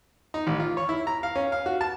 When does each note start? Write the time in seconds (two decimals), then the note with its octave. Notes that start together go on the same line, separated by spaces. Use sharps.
0.34 D#4
0.47 A1
0.60 F4
0.77 C#5
0.89 E4
1.07 A#5
1.23 F5
1.36 C#4
1.52 F5
1.66 F#4
1.81 A5